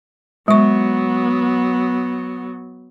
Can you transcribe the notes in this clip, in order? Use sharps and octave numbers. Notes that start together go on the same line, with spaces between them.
F#3 G#3 B3 C#6